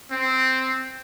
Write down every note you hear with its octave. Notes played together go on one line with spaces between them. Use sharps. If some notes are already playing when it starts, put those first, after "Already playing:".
C4